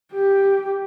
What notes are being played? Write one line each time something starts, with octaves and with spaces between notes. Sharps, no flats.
G4